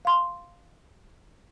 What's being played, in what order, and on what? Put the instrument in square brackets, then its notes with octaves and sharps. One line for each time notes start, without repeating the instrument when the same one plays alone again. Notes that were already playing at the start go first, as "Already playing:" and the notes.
[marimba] F5 C6